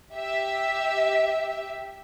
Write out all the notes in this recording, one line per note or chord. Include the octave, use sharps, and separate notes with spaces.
G4 E5